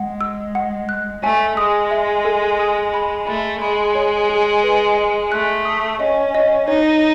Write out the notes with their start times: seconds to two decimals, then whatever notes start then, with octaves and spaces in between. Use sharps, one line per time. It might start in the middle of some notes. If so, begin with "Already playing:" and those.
Already playing: G#3 F#5
0.21 E6
0.55 F#5
0.89 F#6
1.23 A3 G#5
1.57 G#3 D#6
1.91 E5
2.25 A4
2.59 D#6
2.94 B5
3.27 A3 B5
3.61 G#3 B5
3.95 C#5
4.29 G#4
4.64 B4
4.97 D#5
5.31 A3 F#6
5.65 D#6
6.00 C#4 D#5
6.35 D#5
6.68 D#4 C#5